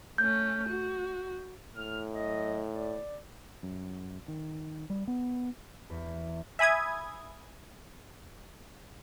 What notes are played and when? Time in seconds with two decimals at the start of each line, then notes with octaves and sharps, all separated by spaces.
0.18 A3 C#4 G6
0.68 F#4
1.76 A2 F6
2.14 F#3 D#5
2.74 D5
3.63 F#2
4.28 D#3
4.90 G3
5.08 B3
5.90 E2
6.59 E5 G#5 B5 D#6 G#6